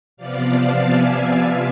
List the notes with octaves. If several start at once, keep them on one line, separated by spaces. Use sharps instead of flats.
C3 F3 B3 D5 F5
F5 A5
E5 G#5
E5 G#5